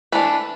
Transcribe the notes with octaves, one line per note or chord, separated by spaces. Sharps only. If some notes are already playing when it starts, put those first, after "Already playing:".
E3 A3 D4 B4